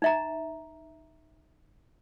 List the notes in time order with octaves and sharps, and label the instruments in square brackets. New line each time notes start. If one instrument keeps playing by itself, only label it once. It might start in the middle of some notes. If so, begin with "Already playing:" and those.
[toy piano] D#4 E5 A#5